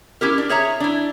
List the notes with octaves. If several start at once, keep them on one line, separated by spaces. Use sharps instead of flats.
C#4 E4 G4 A#4
D4
G#4 C#5 E5 A#5
D4 E4